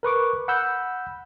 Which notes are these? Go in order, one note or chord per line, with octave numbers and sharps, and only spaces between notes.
A#4 B4 C#6 D6
F#5 B5 E6 G6